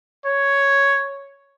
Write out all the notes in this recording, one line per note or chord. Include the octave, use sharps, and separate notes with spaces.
C#5